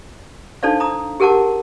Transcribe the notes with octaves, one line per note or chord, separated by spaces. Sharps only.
D4 D#4 A4 C5 D5 F5
A#5 D#6
G4 G#4 A#4 F#5 A5 D6